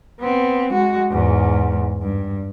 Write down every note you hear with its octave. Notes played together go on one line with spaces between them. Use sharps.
B3 C4
G#3 F#4
E2 G#2
G2